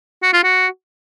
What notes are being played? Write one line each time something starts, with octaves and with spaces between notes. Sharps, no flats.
F#4
F4
F#4